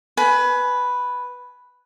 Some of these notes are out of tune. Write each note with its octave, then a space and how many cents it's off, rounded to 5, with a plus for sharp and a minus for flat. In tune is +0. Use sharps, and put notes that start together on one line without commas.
B4 +0 G#5 +25